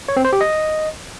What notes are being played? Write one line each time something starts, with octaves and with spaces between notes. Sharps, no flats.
C#5
C4
C5
G4
D#5